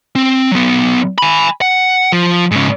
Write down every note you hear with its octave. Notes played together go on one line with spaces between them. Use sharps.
C4
F#3 B3
G#5 B5
F#5
F3
G#2 C#3